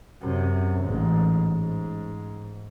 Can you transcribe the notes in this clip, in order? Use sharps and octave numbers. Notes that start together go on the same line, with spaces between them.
F#2 C3
A1 G#2
G#2